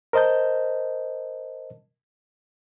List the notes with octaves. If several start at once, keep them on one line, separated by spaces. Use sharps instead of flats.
A#4 C5 D#5 A5 G6